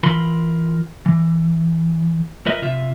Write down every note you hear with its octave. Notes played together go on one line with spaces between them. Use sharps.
E3 F4 A#4 B5 C6
E3
F4 A#4 B4 D#5 E5
C3 F4 E5